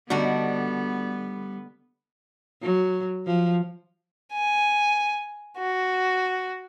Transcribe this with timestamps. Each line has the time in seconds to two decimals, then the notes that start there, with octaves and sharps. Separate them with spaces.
0.10 D3 G3 A3 B3 D4 D#4 F#4
2.62 F#3
3.27 F3
4.33 G#5
5.58 F#4